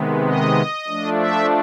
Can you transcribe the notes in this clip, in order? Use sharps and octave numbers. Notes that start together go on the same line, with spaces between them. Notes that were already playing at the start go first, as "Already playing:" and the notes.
Already playing: C3 D#3 G#3 B3
D#5
F3 A3 D4
E5